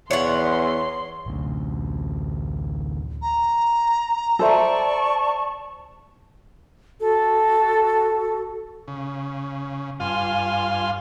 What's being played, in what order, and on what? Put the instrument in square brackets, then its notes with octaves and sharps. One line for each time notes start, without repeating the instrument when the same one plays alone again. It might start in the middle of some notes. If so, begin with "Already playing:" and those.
[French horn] E2 [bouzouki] C#5 F#5 [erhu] C6
[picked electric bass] A1 D2
[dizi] A#5
[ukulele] A4 C5 E5 [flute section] D5 A5 C#6
[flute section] F#4 A4
[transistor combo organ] C#3
[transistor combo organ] G2 F4 F5 [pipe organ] G#5 C6